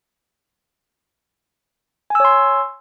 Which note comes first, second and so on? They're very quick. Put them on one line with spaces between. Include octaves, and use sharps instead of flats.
G#5 E6 C#5 C6